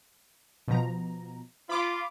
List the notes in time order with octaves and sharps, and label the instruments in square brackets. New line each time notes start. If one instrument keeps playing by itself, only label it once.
[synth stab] B2 F3 A#5
[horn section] F4 [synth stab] B5 D6